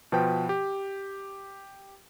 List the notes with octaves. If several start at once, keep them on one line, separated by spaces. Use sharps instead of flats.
B2 F3 B4 C5 G5
G4